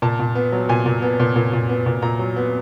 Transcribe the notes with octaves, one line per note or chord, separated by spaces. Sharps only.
A#2 A5
A#2
B3
F#3
A#2 G#5
A#2
B3
A#2
A#2
A#2
B3
A#2
A#2 A#5
F#3
B3